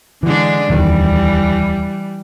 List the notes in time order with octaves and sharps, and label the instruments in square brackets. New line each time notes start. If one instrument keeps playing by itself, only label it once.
[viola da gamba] D3 G#3 D4 [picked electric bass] E3
[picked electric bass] D1 E2 D#3 [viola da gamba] E3 G3